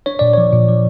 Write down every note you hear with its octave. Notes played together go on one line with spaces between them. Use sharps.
D4 C#5
A#2 D5
F3 C#5
A#2
F3